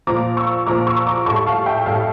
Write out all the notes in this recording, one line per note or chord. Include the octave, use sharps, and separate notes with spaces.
A#2 F3 A#5 D6
C#6 E6
A#2 F3 A#5 D6
C#6 E6
A#5 D6
A2 G3 A5 C#6
F5 A5
E5 G5
A2 G3 F5 A5